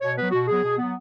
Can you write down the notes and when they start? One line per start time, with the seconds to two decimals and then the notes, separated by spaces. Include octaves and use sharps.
0.01 B2 C#5
0.16 F#3 B3 B4
0.32 B2 F#4
0.47 F#3 B3 G#4
0.63 B2
0.78 F#3 B3